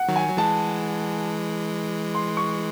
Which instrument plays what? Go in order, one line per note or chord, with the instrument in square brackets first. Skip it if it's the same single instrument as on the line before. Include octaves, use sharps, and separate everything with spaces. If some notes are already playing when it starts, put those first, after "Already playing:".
Already playing: [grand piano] F#5
[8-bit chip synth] D#3 F#3
[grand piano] G#5
[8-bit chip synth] F#3
[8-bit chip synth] E3 G#3 [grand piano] A5
[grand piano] C6
C#6